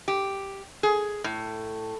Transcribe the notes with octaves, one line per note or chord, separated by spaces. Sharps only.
G4
G#4
A2